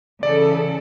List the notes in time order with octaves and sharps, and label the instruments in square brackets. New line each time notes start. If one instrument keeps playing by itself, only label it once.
[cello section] C#3 E3 A4 [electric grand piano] D5